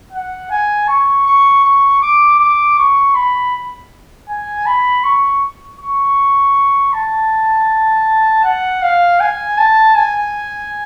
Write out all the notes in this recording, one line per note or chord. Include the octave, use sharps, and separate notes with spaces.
F#5
G#5
C#6
C#6
C#6
D6
D6
C#6
B5
G#5
B5
C#6
C#6
A5
F#5
F5
G#5
A5
G#5